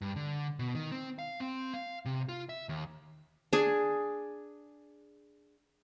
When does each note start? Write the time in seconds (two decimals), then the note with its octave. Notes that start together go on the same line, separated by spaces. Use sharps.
0.02 G2
0.16 D3
0.59 B2
0.75 D#3
0.92 C4
1.19 F5
1.40 C4
1.74 F5
2.05 C3
2.29 F4
2.49 E5
2.69 D#2
3.53 D4 G#4